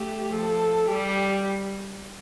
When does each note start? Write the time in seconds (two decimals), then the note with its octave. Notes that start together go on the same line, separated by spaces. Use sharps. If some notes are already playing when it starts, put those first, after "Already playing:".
Already playing: A3 G4
0.32 F3 A4
0.87 G3 G4